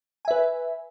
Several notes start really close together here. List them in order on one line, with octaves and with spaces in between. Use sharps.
G#5 E5 B4